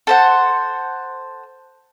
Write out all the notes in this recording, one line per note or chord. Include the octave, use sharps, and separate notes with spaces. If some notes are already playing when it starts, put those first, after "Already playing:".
A4 C5 F#5